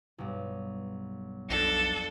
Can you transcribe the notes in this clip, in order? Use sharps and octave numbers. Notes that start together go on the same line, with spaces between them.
B1 G2
B1 F2 D4 A4 A#6